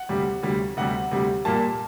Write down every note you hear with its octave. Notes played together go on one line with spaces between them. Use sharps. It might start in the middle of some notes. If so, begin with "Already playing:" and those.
Already playing: F#5
D2 C3 G3
D2 C3 G3
D2 C3 G3 F#5
D2 C3 G3
A#2 G3 A#3 A5